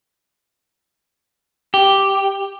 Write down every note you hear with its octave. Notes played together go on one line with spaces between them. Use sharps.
G4